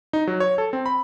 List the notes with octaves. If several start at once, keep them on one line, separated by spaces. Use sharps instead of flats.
D#4
F#3
C#5
A4
C4
B5